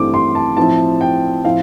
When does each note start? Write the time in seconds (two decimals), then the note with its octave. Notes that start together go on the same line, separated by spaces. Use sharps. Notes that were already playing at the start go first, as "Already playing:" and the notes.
Already playing: G2 E3 A3 C4 E4 D6
0.14 C6
0.35 A5
0.57 A2 F3 C4 E4 A5
1.01 G5
1.44 A2 F3 C4 E4 F5